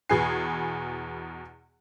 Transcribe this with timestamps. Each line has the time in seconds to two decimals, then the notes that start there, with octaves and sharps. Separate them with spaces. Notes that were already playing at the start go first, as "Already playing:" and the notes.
0.09 E2 B2 G#4 B4 G#5 C7